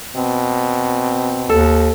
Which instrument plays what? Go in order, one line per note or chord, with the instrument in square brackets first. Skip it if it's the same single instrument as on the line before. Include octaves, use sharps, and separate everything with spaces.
[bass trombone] B2 [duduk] C4
[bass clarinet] D#2 [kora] A4